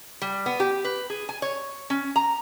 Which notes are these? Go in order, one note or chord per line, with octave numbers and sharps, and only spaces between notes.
G3
B3
G4
B4
G#4
G#5
C#5
C#4
A#5